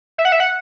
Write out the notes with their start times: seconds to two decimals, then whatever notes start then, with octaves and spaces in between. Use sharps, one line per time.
0.18 E5
0.25 F#5
0.32 E5
0.40 F#5